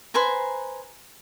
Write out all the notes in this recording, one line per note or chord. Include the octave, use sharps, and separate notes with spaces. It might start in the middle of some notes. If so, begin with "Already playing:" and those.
B4 C5 G#5 A#5